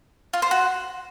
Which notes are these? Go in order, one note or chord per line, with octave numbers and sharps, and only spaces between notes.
F4
C5
F#4